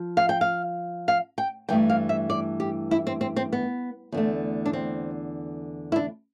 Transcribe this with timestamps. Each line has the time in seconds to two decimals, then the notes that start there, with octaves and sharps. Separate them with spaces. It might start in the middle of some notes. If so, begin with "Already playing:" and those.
Already playing: F3
0.17 F5
0.29 G5
0.41 F5
1.08 F5
1.38 G5
1.69 G2 E3 A3 G5
1.90 F5
2.09 E5
2.30 D5
2.60 G4
2.91 E4
3.07 C4
3.21 C4
3.36 C4
3.53 B3
4.12 E2 D3 A3
4.66 D4
4.73 C4
5.92 E4
5.96 D4